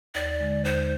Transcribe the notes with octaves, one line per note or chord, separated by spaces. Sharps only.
D#2 D5
D3 G#3
D#2 C5